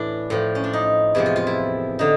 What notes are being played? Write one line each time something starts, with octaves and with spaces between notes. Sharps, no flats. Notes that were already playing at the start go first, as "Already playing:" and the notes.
Already playing: A2 E3 D4
A2 F3
C#4
D4
D#4
E2 C3 F3 E4
F4
F4
E4
D3 D#4